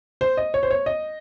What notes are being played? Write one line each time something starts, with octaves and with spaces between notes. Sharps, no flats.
C5
D#5
C#5
C5
C#5
D#5